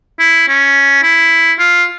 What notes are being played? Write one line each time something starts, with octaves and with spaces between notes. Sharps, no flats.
E4
C#4
E4
F4